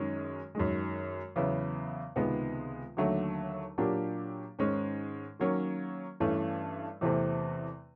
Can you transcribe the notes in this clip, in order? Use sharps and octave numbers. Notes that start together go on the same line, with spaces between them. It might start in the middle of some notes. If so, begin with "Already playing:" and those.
Already playing: F#2 D#3 G#3 C#4
F#2 D#3 G#3
E2 C#3 F#3 B3 E4
C#2 C3 D#3 G#3 B3
D#2 D3 F#3 A3
A#2 F#3 A#3 D4 G4
G#2 D#3 G#3 C#4
D#3 F#3 A#3 C#4
G2 E3 A3 C#4
E2 C3 E3 A3 C4